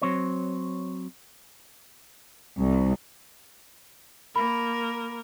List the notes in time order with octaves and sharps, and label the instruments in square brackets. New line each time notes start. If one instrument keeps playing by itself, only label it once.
[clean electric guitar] F#3 C4 C#5
[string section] C2
[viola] A#3 A#4 [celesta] B5